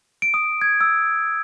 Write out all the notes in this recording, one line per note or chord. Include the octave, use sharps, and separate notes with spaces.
D7
D#6
G#6
E6